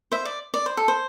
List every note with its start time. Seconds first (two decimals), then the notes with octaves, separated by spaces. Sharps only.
0.12 C5 E5
0.25 D5
0.54 D5
0.66 C5
0.77 A4
0.88 C5